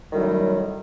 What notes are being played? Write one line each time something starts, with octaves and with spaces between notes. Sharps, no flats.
F#2 A2 D#3 F#3 G3